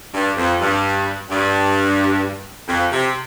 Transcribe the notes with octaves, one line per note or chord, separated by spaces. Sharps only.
G2
F2
G2
G2
F2
C3